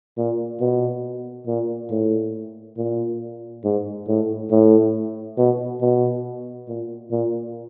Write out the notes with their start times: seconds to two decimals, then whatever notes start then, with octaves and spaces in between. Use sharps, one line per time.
0.17 A#2
0.61 B2
1.47 A#2
1.91 A2
2.77 A#2
3.64 G#2
4.08 A2
4.51 A2
5.38 B2
5.81 B2
6.68 A#2
7.12 A#2